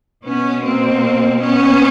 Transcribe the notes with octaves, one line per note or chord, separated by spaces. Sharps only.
B2 B3 C#4
A#3 C4
B3 C#4